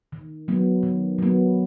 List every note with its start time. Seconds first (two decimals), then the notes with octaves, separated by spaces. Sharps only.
0.12 D#3
0.48 F#3 B3
0.83 D#3
1.19 F#3 B3